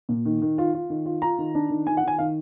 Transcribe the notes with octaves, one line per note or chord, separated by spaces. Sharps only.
A#2
D#3
D#3
F4
F4
D#3
F4
F4 A#5
D#3
D4
D#3
D#3 G#5
F#5
D#3 G#5
D#3 F5